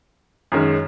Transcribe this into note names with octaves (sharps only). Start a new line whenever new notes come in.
F#2 D#3 G#3 C#4